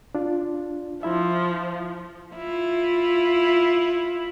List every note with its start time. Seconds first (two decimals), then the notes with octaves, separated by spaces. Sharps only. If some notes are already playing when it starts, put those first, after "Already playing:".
0.15 D4 F4
1.03 F3 E4 E5
2.36 E4 F4